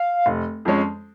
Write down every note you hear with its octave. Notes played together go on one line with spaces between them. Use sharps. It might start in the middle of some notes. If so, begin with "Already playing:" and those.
Already playing: F5
F1
F2 F3 G#3 C#4